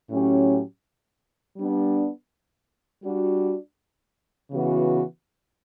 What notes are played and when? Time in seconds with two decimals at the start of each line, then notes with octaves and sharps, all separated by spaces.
0.10 A2 F#3 C#4 G4
1.57 G3 B3 D4
3.04 G3 D4 F#4
4.51 C#3 E3 B3 F#4